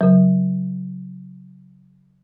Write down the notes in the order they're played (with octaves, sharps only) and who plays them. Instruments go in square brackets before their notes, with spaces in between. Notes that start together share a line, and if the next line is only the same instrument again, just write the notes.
[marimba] C#3 F#3